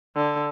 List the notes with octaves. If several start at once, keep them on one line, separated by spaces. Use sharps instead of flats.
D3